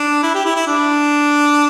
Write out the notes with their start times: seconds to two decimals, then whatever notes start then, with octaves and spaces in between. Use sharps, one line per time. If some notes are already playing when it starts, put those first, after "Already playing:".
Already playing: D4
0.23 E4
0.34 G4
0.45 E4
0.56 E4
0.67 D4